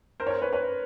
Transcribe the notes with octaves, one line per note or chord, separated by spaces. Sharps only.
A#4 C5
C#5
A#4 C5
B4 C#5
B4 C#5